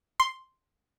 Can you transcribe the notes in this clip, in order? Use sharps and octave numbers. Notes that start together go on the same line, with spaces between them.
C6